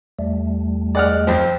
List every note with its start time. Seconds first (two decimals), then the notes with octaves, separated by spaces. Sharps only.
0.19 E2 G3 A3
0.95 G#3 D5 F#5 F6
1.27 F2 F3 C4